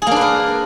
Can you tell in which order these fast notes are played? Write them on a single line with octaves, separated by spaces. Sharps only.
G#4 A#3 D4 B4 A#4